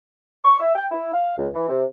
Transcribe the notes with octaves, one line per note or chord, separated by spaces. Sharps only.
C#6
E5
G5
E4
F5
C#2
E3
C3